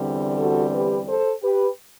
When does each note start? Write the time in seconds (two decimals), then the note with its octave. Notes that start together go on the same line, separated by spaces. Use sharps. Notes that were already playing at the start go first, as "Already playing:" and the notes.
Already playing: E2 D3 G3 C4
0.39 F#4 A4
0.73 G4 B4
1.08 A4 C5
1.43 G4 B4